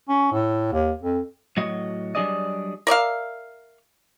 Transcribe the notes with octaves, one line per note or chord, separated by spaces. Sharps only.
C#4
A2
D#2
F2
A2 F#3 F#4 D#5
F#3 G3 D4 G#4 D5 D#5
A#4 D5 E5 F5